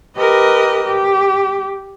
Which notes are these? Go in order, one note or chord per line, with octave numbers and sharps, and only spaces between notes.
G4 A#4 B4 D#5
G4